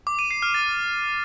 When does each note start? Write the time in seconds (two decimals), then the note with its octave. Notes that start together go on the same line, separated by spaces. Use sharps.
0.07 D6
0.19 D#7
0.31 C7
0.42 F6
0.54 A6